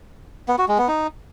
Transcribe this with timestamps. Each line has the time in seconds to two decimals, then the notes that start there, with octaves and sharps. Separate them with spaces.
0.48 B3
0.58 F#4
0.68 G#3
0.78 B3
0.88 D#4